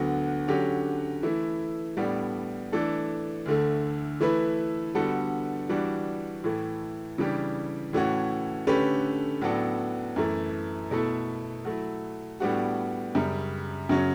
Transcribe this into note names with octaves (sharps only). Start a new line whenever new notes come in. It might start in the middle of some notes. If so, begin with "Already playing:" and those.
Already playing: D2 D3 F#3 B3 F#4
D3 F#3 C#4 G4
E3 A3 E4
A2 G3 B3 D4
E3 A3 D4 A4
D2 D3 A3
E3 A3 E4 B4
D3 G3 B3 F#4 A4
E3 G3 D4 F#4
A2 E3 A3
C#3 E3 G3 D4 G4
A2 E3 A3 C#4 F#4
D3 A3 C#4 G4 B4
A2 F#3 B3 D4 A4
F#2 E3 A3
B2 A3 E4 A4
F#3 A3 E4
A2 G3 B3 D4 F#4
F#2 C#3 G3
F#2 C#3 F#3 C#4